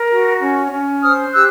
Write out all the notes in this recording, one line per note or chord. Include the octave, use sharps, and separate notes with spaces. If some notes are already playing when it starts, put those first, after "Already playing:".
Already playing: A#4
F#4
C#4
C#4
C5 D#6 F6
G4 E6 F#6